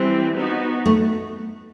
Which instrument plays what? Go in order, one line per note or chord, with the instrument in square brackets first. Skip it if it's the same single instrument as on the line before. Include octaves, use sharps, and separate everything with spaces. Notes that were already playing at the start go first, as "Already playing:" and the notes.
Already playing: [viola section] E3 G3 C4
B3 D#4 F#4
[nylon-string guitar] A3